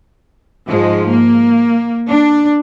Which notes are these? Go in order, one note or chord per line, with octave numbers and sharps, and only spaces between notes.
G#2 F3 G#3
A#3
D4